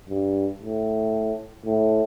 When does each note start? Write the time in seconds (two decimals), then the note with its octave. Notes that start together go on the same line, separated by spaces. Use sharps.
0.10 G2
0.62 A2
1.66 A2